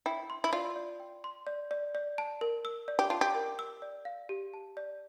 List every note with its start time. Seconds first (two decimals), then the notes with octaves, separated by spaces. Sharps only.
0.06 E4 G5
0.30 C6
0.44 E4
0.53 F4 D5
0.76 D5
1.00 G5
1.24 C6
1.47 D5
1.71 D5
1.95 D5
2.18 A5
2.41 A#4
2.65 E6
2.88 D5
2.99 G4
3.10 F4 A5
3.21 G4
3.35 A#4
3.59 E6
3.82 D5
4.05 F5
4.29 G4
4.54 A5
4.77 D5